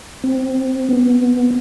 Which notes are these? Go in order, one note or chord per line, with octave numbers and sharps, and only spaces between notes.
C4
B3